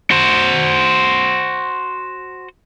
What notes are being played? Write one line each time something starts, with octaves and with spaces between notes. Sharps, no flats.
F#4 C5